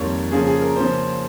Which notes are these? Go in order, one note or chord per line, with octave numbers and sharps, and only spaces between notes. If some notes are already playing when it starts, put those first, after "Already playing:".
Already playing: F2 D#3 G3 A#3 C#5
C#3 F3 A#3 C#4 G#4
G#4
A#4
C#3 F3 A#3 C#4 C5